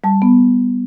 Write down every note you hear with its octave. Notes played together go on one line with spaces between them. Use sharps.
G3 A5
B3